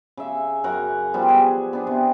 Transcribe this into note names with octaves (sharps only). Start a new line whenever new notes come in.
C#3 E5
F#2 A#4 C#5 F#5
F3 G3 B3
G#4
B3 D4
C3